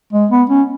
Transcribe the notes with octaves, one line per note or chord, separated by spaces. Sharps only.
G#3
B3
C#4